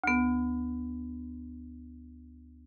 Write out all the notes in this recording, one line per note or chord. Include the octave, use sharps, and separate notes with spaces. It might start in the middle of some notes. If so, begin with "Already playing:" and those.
D2 B3